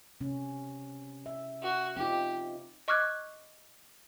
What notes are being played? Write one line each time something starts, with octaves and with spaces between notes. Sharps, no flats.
C3 C#4
E5
F#4
C4 D#4 F4 G4
D#5 C#6 D6 F6 F#6 G#6